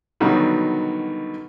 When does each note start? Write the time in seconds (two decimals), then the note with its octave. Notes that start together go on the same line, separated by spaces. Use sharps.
0.20 B2 D3 D#3 F#3 G3